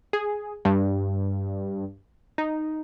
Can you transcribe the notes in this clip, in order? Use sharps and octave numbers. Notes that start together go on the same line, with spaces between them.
G#4
G2
D#4